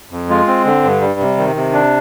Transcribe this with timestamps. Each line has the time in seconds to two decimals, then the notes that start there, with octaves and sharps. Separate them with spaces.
0.11 F2
0.29 G#3 F4
0.47 C4
0.65 D3
0.83 G2
1.01 G3
1.20 C3
1.38 D#3
1.56 C3
1.73 D4